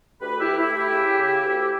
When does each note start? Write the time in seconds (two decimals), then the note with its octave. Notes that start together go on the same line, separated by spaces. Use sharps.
0.21 D2 G4 B4
0.40 E4 G4
0.46 D2
0.58 E4
0.71 A3
0.76 E4 G4
0.94 C#3
1.19 C#3
1.43 D2